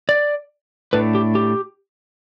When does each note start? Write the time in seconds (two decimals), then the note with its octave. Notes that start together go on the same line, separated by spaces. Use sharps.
0.09 D5
0.93 A2 A3 D4 B4
1.15 G4
1.35 G4